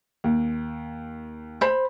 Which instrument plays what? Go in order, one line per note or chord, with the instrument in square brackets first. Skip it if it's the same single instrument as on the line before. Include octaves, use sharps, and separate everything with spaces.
[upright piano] D#2
[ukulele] C5 B5